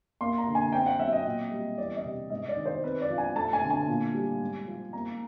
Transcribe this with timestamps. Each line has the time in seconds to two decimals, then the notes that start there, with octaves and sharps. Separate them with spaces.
0.21 A#3 C6
0.38 A#5
0.47 D3
0.55 G#5
0.72 C4 G5
0.86 F#5
0.99 F#3 E5
1.12 D#5
1.26 A#2
1.51 G3
1.78 E2 D5
1.96 D#5
2.05 C3
2.30 G#2 D#5
2.49 D5
2.57 D#3
2.66 C5
2.83 C4 B4
3.01 D5
3.10 F3
3.18 G#5
3.35 A3 A5
3.53 G#5
3.62 D3
3.70 G#5
3.88 A#2
4.14 G3
4.41 G#2
4.67 F3
4.93 A#3 A#5